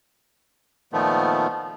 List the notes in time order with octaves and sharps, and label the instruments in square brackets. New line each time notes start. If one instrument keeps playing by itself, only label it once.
[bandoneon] A#2 D#3 F3 A3 B3